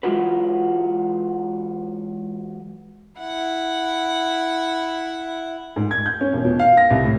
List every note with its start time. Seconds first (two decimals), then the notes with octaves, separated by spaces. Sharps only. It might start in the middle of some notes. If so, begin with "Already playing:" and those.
0.03 E3 F#3 G#3 F4 F#4 B4
3.20 E4 F#5
5.76 G#2
5.91 G#6
6.06 G6
6.21 C#4
6.33 E1
6.45 B2
6.59 F5
6.77 A#6
6.90 C2
7.03 A2